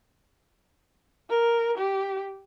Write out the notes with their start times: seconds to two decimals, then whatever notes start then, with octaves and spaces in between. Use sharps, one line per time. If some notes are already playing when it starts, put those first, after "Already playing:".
1.30 A#4
1.78 G4